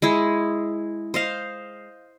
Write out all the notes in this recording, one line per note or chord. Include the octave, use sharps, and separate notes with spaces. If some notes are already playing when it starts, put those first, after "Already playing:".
G#3 E4 G#4
C5 D#5 F5